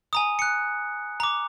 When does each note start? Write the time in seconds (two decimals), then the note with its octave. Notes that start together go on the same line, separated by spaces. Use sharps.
0.13 G#5 A#5 D#6
0.39 F#6 C#7
1.20 A#5 D6